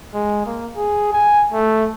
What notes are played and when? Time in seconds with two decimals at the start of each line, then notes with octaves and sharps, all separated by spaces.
0.14 G#3
0.46 A#3
0.77 G#4
1.13 G#5
1.52 A3